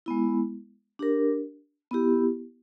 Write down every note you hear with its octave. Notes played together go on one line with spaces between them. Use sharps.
G#3 B3 E4
D4 G4 A#4
B3 E4 G4